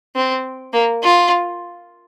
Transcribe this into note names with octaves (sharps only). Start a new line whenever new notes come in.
C4
A#3
F4